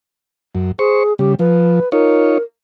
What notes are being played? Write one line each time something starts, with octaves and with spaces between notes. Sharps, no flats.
F#2
G#4 C5 C#6
C#3 G3 G4
F3 B4
D#4 F4 A#4 C#5